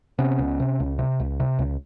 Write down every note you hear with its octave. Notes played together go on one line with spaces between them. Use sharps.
C3 B3 C#4
C#2
C3
C#2
C3
C#2
C3
C#2